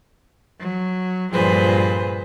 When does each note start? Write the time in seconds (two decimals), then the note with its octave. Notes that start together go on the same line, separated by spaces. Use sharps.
0.59 F#3
1.32 G2 A#2 F3 G#4 B4 C5